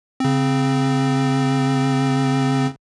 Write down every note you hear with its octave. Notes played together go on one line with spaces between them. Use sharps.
C#3 C4